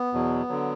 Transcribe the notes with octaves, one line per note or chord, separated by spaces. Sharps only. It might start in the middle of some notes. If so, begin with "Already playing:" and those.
Already playing: B3
E2 B2 F#3
D3 F#3